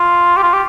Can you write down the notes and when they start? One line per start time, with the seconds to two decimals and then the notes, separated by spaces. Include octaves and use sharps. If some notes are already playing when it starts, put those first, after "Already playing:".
Already playing: F4
0.37 G4
0.43 F4
0.53 G4